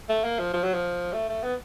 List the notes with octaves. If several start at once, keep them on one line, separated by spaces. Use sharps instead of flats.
A3
A#3
F3
F3
F#3
F3
A3
A3
B3